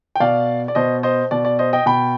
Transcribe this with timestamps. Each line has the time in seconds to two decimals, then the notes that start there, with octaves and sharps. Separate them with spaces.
0.16 G5
0.20 B2 D5 F5
0.68 D5
0.75 B2 C5 D#5
1.03 C5 D#5
1.31 B2 D5
1.45 D5
1.59 C5 D#5
1.73 D#5 G5
1.86 B2 G5 B5